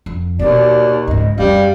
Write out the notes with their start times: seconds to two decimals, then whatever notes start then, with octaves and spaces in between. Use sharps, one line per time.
0.06 F2
0.39 D#2 B2 D5
1.08 C#2 G#2 D#5
1.38 F#2 G3 C#4 F5